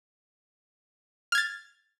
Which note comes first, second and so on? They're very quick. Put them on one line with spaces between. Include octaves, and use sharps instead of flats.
F6 G#6 A6